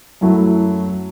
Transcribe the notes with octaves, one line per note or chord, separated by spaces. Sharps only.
F#2 F#3 A3 E4